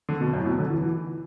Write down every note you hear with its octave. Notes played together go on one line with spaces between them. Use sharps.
D3
B2
F#2
A2
B2
D3
E3
E3